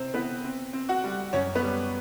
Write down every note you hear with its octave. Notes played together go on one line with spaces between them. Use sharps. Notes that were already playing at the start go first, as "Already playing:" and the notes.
Already playing: C3 C4 C5
E3 B3 B4
C4
C4
F#4 F#5
G3
F#2 C#4 C#5
B3 B4
G3